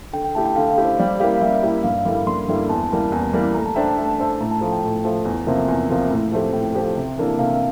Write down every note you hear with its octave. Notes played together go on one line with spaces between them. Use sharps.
D3 G5
G5
A3 E4 G4 A5
G5
D3 F5
F5
A3 E4 G4
C5
G3 D5
A#3 E4 G4 F5
G3 E5
A#3 E4 G4
G2 F5
D3 G3 A#3 E4
G2 C6
D3 G3 A#3 E4
E2 A5
E3 G3 A#3
E2
E3 G3 A#3
A3 A#5
A5
D4 A4 C5 E5 G5
A5
A3 A5
D4 A4 C5 E5
A2 A#5
A5
F3 A3
G5
A2
F3 A3
E2
C3 F3 A#3
E2
C3 F3 A#3
A2
F3 A3 C4 G4
A2 G5
F3 A3 C4 G4
C3
E3 A#3 D4 A4
C3 F5